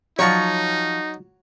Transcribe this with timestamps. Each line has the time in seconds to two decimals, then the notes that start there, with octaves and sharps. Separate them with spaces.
0.19 F3 F#3 D#4 C#5 A#5 C#6